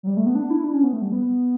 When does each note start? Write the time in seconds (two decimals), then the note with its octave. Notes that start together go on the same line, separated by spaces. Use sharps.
0.03 F#3
0.07 G3
0.17 A3
0.26 B3
0.35 D4
0.50 E4
0.64 D4
0.74 C#4
0.84 B3
0.93 A3
1.02 G3
1.12 B3